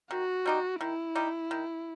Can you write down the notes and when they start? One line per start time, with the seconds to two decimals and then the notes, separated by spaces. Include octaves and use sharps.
0.11 D#3 F#4
0.46 G3 D#4 G4
0.81 D#3 E4
1.15 G3 D#4 G4
1.51 D#3